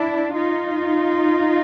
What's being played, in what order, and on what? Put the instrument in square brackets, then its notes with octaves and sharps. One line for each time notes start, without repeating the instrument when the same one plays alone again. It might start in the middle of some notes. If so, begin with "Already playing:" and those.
Already playing: [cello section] D4 E4
D#4 F4